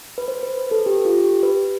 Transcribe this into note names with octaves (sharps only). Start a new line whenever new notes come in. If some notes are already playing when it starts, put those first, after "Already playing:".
B4
C5
B4
B4
A4
G4
F4
G4
B4